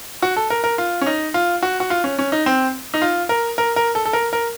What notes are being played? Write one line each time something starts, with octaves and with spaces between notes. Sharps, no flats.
F#4
A4
A#4
A#4
F4
C#4
D#4
F4
F#4
F#4
F4
C#4
C#4
D#4
C4
D#4
F4
A#4
A#4
A#4
A4
A4
A#4
A#4